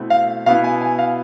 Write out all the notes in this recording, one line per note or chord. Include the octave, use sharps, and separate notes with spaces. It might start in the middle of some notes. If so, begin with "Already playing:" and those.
Already playing: B2 A3 C4 E4
F5
B2 B3 E4 F5
G#5
G#5
F5